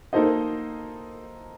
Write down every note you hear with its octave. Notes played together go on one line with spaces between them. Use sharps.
A#3 D#4 A4 C5 D#5